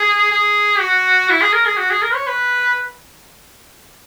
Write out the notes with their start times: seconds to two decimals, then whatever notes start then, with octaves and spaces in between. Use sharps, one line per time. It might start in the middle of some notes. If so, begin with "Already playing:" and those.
Already playing: G#4
0.32 G#4
0.80 F#4
1.30 E4
1.41 G#4
1.53 A#4
1.66 G#4
1.78 F#4
1.91 G#4
2.02 A#4
2.14 C#5
2.27 B4